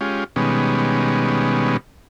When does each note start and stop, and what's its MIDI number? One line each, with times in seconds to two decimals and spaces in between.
0.01 0.24 56
0.01 0.24 61
0.01 0.24 65
0.01 0.24 67
0.36 1.77 47
0.36 1.77 51
0.36 1.77 55
0.36 1.77 56
0.36 1.77 59
0.36 1.77 61